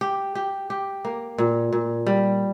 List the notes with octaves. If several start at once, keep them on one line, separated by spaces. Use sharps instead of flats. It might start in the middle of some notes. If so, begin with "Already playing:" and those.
G4
G4
G4
A#3
A#2
A#2
G3